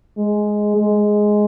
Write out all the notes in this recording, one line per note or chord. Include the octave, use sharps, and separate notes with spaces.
G#3
G#3